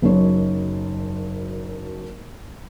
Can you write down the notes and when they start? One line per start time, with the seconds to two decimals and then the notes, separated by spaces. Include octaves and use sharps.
0.02 F#1 F#2 D#4 C#5